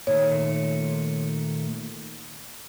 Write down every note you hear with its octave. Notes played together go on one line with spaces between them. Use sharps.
A#2 D#3 A3 C#5